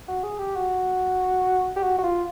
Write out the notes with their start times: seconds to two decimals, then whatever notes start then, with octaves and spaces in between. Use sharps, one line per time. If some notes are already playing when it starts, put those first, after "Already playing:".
0.08 F#4
0.23 G#4
0.39 G4
0.56 F#4
1.76 G4
1.83 F#4
1.99 F#4
2.04 F4